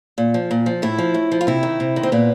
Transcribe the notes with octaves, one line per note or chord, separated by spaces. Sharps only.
A#2
F3
A#2
F3
A2 E4
F3
A2
F3
F4
C3 E4
D#3
C3
D#3
C4
A#2 B3